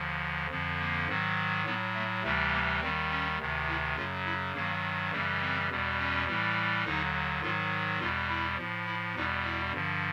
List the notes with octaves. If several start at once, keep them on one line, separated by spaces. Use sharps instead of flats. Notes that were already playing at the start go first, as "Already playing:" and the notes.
Already playing: D#2 D3 F3
F2 D3 F3
A#3
G#2 D#3 F#3
A2 F#3 B3
A3
D2 C3 E3 G3 A3
A#3
D#2 D#3 G3 C4
C#4
D2 C3 D#3
E4
F#2 C#3 F#3 F4
E4
G2 D#3 F#3 A#3
F#2 C#3 E3 G3 A#3
C4
E2 B2 G3
C#4
A2 E3 G3
D#2 D3 F#3 D#4
G#2 D#3 F#3 F4
E2 B2 G3 F4
E4
A2 F3
E4
E2 B2 G3 D#4
E4
G2 D3 F3